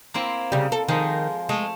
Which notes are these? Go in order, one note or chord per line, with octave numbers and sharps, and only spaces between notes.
A#3 C4 E4
C#3 G3
A4
D#3 F3 G#3
G#3 A3